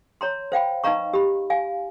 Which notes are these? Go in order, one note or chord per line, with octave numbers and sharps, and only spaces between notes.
C#5 A#5 C6
C5 F5 G5 B5
D#4 B4 D#5 F5 A#5 C#6
G4 B5
F5 G#5